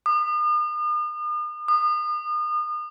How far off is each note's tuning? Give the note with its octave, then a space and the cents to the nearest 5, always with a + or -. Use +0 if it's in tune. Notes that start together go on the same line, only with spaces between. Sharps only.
D#6 -45
D#6 -35